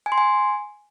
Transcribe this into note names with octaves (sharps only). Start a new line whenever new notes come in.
G#5
C6
G#5